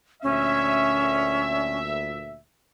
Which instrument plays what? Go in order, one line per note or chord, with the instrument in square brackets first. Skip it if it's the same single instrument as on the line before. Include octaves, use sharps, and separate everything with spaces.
[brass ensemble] D2 A#2 E5 [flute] C#4